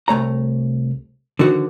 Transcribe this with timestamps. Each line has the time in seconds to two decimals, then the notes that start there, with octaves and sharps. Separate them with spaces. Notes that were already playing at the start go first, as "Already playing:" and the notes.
0.08 C2 A3 C#5 A#5
1.39 D3 D#3 F3 F#4